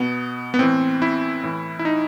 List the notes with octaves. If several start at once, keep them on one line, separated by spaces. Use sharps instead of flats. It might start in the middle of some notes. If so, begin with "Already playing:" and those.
Already playing: B2 B3
B3
A2 E3 C4
E4
A2 E3
E4
D#4